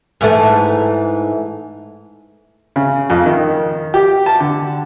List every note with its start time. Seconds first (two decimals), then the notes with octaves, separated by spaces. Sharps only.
0.21 G#2 E3 A3
2.76 C#3
3.10 F2
3.26 D#3
3.94 G4
4.26 A5
4.40 D3